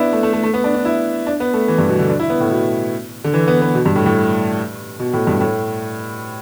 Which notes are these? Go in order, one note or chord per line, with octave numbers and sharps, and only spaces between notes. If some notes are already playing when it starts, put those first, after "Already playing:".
Already playing: B3 D4 E4
A3
A3
A3
A3
B3
D4
D4
E4
D4
B3
A3
E3
G2
B2
D3
D4
E4
B3
A2
B2
D3
E3
B3
B3
B2
G2
A2
A2
B2
A2
G2
A2